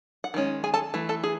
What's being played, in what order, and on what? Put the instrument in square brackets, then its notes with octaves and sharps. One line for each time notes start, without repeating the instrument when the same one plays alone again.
[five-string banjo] F#5
D#3 G#3 C#4
G#4 G#5
A4 A5
E3 A3
A4 A5
G#4